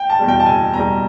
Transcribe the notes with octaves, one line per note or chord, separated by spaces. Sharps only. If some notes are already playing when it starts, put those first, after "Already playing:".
Already playing: G5
A5
E2 B2 G3
G5
A5
F#1 G#5
E2 B2 G3 A#5